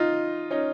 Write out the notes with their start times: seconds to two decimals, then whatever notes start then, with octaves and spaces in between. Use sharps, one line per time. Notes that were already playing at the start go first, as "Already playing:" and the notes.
Already playing: D#4 F4
0.51 C#4 D#4